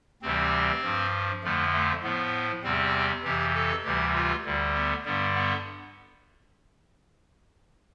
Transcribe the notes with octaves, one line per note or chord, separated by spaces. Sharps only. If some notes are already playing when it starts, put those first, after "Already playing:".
D2 C3 E3 G3 C4
G2 F3
F2 D3 F3 A3
A3
A2 F3 B3
E2 C3 G3 C4
F2 C3 E3 G4
A4
D2 C3 E3 G3 G4
F4
D2 D3 G3
B3
G2 D3 G3 B3
B3